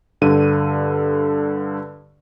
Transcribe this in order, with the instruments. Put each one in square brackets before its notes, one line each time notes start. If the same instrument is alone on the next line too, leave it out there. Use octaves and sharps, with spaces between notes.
[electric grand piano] G2 D3 D#7